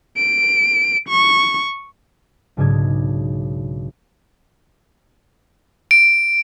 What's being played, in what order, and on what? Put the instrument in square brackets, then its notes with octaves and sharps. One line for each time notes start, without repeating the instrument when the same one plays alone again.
[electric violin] D7
C#6
[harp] B1 G#2 C#3 D4 G#4 G#6
[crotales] D7